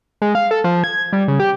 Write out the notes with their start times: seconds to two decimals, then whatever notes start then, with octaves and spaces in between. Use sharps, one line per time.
0.22 G#3
0.35 F5
0.51 A4
0.64 F3
0.84 G#6
1.13 G3
1.28 C#3
1.40 G4